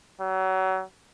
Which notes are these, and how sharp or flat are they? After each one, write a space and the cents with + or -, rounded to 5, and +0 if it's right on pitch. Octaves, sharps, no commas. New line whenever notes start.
F#3 +30